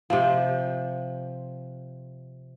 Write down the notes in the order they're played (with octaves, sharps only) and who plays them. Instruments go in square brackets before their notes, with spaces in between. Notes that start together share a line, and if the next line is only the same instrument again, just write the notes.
[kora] C3 F3